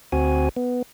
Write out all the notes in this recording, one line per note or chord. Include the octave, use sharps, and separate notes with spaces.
D2 C4 F#4 G#5
B3